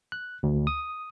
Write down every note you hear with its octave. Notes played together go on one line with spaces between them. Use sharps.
F#6
D2
D#6